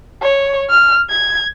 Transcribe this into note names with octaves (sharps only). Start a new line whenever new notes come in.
C#5
F6
G#6